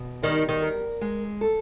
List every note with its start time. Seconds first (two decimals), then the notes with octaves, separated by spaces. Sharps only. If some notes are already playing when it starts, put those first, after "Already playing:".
Already playing: B2
0.22 D#3 G3
0.49 D#3
0.62 A#4
1.01 G#3
1.41 A4